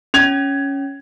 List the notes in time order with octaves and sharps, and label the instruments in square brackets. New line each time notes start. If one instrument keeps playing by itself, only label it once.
[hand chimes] C#4 [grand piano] G#6 F7